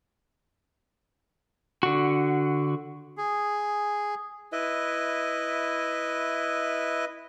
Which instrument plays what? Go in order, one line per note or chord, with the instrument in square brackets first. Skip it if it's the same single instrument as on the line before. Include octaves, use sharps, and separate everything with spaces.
[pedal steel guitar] D3 F#4
[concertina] G#4
[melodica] E4 B4 D#5 E5